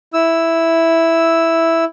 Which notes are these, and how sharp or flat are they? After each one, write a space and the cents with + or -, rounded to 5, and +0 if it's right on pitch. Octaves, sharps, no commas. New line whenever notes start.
E4 +0 E6 +0